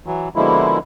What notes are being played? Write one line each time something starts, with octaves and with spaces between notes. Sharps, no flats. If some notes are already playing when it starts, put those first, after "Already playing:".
E3 F#3
B2 D3 F3 G#3 A#3 E4